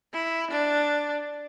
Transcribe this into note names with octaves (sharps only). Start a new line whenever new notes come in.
E4
D4